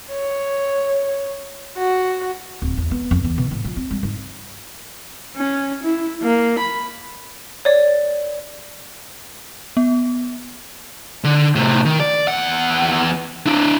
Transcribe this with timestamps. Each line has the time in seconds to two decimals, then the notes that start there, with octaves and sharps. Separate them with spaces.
0.12 C#5
1.77 F#4
2.62 D1
2.77 E2
2.91 B3
3.11 F2
3.24 E2
3.38 B2
3.51 A2
3.65 F3
3.76 C4
3.91 G3
4.03 G#2
5.36 C#4
5.84 E4
6.22 A#3
6.59 B5
7.65 C#5 D5
9.77 B3
11.24 D3
11.55 A2 C3
11.85 D#3
12.00 D5
12.28 E2 F#5
13.46 D4 E4